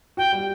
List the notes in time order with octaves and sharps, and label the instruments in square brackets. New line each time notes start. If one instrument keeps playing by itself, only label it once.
[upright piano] F#4 [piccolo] G5
[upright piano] G3